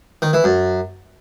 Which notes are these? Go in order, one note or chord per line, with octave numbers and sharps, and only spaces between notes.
D#3
E3
F#2